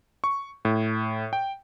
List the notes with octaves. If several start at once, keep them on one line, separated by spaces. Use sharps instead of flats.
C#6
A2
G5